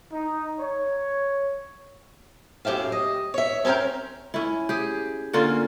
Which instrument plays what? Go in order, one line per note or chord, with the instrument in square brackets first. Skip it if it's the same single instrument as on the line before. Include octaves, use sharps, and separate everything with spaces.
[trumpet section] D#4
C#5
[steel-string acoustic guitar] F#2 A2 G4 E5 F5
D#5
C#5 E5
C4 C#4 A4 A#4 G5
[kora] C#4 E4
G4 G#4
D3 A#3 C#4 F4